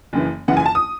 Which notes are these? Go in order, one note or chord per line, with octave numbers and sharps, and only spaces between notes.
F#1 F#2 E3
F#1 F#2 E3 F#5
G#5
A5
D#6